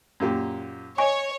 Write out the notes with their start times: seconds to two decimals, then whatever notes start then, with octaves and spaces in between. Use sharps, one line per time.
0.20 F#2 A#2 G4
0.98 C#5 D#5 G#5 C#6